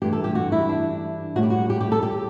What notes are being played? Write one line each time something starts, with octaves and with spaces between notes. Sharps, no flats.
G2 E3 A3 G4
A4
G4
F#4
E4
D4
A2 G3 F#4
G4
F#4
G4
G4
A4
G4